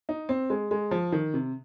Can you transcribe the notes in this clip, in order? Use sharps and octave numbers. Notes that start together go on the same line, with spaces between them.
D#4
C4
G#3
G#3
F3
D#3
C3